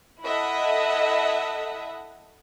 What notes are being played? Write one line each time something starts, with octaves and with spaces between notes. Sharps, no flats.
E4 A4 D#5 E5 F#5